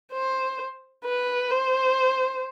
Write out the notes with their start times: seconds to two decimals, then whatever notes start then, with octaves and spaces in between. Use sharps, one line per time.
0.12 C5
1.05 B4
1.51 C5